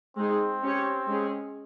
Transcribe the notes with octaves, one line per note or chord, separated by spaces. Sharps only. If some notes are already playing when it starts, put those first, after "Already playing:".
G#3 C4 D#4 G#4
C#4 G4 C#5
G#3 C#4 G#4